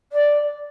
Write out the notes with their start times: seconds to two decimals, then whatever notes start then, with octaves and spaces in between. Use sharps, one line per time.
0.12 D5